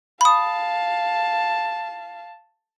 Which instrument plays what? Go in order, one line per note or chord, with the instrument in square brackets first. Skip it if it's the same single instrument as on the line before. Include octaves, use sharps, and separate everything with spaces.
[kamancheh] F5 A5 [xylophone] B5 D#6